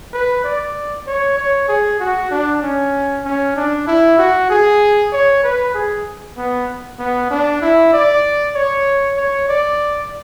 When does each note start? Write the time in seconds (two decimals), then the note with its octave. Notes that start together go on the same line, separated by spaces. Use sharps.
0.13 B4
0.44 D5
1.06 C#5
1.38 C#5
1.68 G#4
2.00 F#4
2.31 D4
2.62 C#4
3.24 C#4
3.56 D4
3.87 E4
4.18 F#4
4.50 G#4
5.12 C#5
5.43 B4
5.74 G#4
6.37 B3
6.99 B3
7.31 D4
7.61 E4
7.93 D5
8.55 C#5
9.17 C#5
9.49 D5